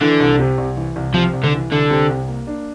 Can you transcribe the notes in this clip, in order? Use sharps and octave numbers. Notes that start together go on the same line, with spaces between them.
D3 E3
C2
C3
C2
E3
C2
C3 F3
C2
D3
E3
C2 D3
C3
C2
A#3
D4